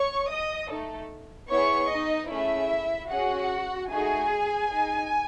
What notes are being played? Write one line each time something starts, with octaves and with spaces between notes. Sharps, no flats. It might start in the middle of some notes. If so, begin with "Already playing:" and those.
Already playing: C#5 C#6
D#5 D#6
A3 D#4 A4
B3 E4 G#4 C#5 C#6
D#4 D#5
A3 C#4 E4 G#4 E5
C#4 F#4 G#4 F#5
A3 D#4 F#4 G#4 G#5
D#4 G#4